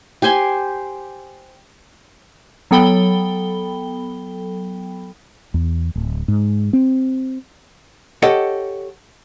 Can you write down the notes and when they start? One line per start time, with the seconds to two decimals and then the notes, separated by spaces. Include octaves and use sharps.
0.22 G4 C5 G#5 C6
2.71 F#3 B3 A4 G5 B5 G7
5.54 E2
5.95 D1
6.28 G#2
6.73 C4
8.22 G4 A4 C#5 D#5 F#5